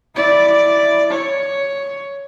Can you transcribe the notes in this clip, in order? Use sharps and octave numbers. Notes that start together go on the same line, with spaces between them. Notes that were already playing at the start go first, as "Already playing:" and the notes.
E4 D5
C#5